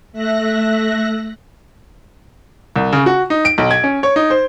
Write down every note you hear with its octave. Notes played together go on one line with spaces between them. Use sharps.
A3 E5 F#6 A#6
C2
C#3
F#4
D#4
D7
B1
G#6
C#4
C#5
D#4
C5